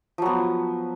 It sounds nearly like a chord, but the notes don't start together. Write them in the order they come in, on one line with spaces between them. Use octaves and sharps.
F3 F#3 B3